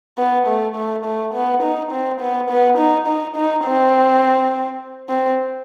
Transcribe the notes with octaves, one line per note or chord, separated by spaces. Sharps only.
B3
A3
A3
A3
B3
D#4
C4
B3
B3
D#4
D#4
D#4
C4
C4